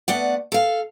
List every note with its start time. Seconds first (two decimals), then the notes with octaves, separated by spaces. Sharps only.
0.08 A3 B3 D5 F#5
0.52 A4 F5